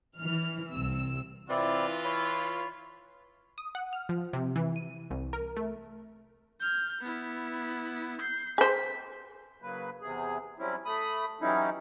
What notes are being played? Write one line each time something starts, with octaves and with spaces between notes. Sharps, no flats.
E3 F6
C2 C3 E6
E3 C4 E4 F4 D5
C#5 B5
D#6
F#5
F6
F3
C3
E3
D#7
C2
A#4
A3
F6 G6
B3 E4
G6 C7
G#4 C5 B6
C#3 F#3 A#3 B4
E2 C3 G#4
F#3 G3 C4 C#4 E4
A3 B5 D#6
E3 F#3 G3 C#4 D#4 E4